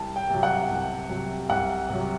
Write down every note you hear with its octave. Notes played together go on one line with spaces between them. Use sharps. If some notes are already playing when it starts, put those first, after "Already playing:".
Already playing: C2 A5
G5
C3 F#3
F#5
C2
C3 F#3
C2 F#5
C3 F#3